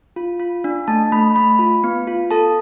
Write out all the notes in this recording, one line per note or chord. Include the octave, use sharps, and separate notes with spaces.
F4
F4
D4
A3 A5
A3 B5
A3 B5
F4
B3
F4
A4 A5